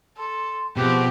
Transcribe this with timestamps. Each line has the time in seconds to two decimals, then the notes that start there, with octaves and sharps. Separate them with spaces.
0.18 A4 C6
0.77 B2 F3 C4 G4 G#4